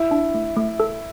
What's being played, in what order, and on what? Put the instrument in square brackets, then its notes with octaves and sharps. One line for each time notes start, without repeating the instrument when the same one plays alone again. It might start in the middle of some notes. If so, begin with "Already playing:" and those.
Already playing: [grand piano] E4
[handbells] D4
A3
A3
A4